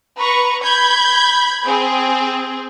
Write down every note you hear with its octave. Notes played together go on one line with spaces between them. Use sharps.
B4 A#5 C#6
B5 G6 G#6
C4 G#4